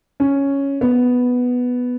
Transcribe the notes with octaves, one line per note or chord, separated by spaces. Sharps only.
C#4
B3